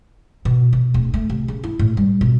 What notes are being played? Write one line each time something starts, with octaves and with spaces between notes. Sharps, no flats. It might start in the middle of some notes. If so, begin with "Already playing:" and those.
B2
B2
D1
A3
C3
C#3
E4
A2
G3
B2